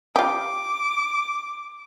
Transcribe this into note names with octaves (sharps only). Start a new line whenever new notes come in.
F4 G4 D6